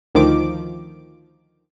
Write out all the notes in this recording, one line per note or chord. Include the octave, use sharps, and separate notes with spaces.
D2 D#3 F3 D6 D7